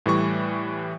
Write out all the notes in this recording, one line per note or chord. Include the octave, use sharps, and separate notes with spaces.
A2 E3 G3 C#6